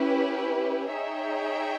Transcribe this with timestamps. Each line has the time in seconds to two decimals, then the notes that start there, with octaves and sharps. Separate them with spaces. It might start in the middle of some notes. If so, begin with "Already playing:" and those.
Already playing: C#4 E4 G4 B4
0.90 D#4 G#4 C#5 E5 G5